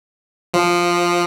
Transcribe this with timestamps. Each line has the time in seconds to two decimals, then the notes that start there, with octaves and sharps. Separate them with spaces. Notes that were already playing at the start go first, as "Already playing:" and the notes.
0.54 F3